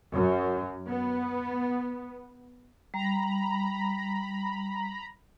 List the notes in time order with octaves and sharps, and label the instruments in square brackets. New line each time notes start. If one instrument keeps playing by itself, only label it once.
[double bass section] F#2
B3
[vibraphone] G3 [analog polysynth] A#5 B5